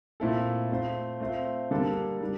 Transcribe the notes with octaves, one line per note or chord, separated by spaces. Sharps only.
A#2 A3 C4 E4 A4
A3 C4 F4 C5
A3 C4 F4 C5
D3 G3 A#3 D4 A4
G3 D4